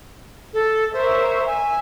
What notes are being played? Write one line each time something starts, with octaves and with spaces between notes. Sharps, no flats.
A4
A#4 C5 C#5 E5
E5 G#5